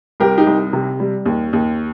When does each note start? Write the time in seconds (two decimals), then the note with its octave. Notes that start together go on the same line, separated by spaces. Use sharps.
0.20 C2 G4 A#4
0.38 D#4 G4
0.46 C2
0.73 C3
1.00 G3
1.26 D#2
1.53 D#2